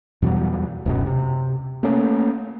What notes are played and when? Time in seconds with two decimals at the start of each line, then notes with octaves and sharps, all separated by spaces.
0.22 E2 B2 F#3 G3
0.86 D1 F#2 B2
1.06 C3
1.83 A3 A#3 C#4